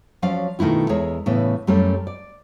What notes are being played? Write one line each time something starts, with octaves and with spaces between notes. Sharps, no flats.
F3 F#3 C#4 D5 F5
B2 D#3 A3 E4 F4
E2 G#3 G#4 A#4 C#5 E5
A2 C#3 E3 B3
F#2 G3 A3 A#3 C#4
D5